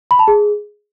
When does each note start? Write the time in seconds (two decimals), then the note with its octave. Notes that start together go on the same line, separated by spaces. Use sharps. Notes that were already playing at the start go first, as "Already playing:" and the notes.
0.11 B5
0.19 A5
0.28 G#4